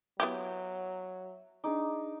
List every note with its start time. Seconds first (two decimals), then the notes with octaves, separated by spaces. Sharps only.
0.20 F#3 B3 E4 G4 E5
1.64 D4 D#4 G#4 D6